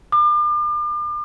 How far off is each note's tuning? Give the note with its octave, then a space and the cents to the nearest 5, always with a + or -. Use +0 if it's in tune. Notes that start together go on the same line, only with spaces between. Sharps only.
D6 +40